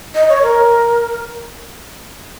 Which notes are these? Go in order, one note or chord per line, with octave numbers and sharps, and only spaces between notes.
D#5
C#5
A#4